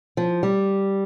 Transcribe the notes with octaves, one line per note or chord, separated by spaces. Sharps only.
F3
G3